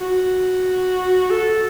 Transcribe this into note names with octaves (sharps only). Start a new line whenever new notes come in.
F#4
A4